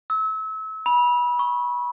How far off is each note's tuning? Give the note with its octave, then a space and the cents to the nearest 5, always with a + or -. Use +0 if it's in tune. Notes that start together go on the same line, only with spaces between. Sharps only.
E6 -30
B5 -25
C#6 -30